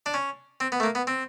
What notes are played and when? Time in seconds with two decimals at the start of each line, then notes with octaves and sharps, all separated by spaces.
0.06 D4
0.14 C#4
0.60 C4
0.72 B3
0.80 A3
0.83 A#3
0.95 B3
1.07 C4